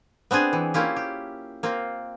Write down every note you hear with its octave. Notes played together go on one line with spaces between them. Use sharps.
B3 C4 D4 G#4 G#5
E3
A#3 C#4 E4 F4 G4
G4
A#3 C4 F4